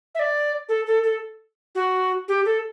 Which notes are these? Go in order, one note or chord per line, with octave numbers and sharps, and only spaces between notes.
E5
D5
A4
A4
A4
F#4
G4
A4